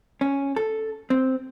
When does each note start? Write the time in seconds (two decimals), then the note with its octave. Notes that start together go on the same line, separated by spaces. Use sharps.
0.21 C#4
0.56 A4
1.10 C4